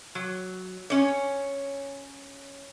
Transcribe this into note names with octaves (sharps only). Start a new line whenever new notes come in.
F#3
C#4 C#5